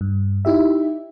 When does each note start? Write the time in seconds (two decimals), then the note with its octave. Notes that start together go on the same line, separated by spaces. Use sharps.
0.01 G2
0.45 D#4 E4 G4 E5